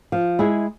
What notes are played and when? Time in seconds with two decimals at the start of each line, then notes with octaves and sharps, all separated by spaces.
0.12 F3
0.39 G#3 E4 G#4